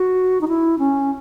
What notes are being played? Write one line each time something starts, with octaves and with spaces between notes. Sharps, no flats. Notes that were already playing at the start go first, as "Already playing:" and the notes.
Already playing: F#4
D#4
E4
C#4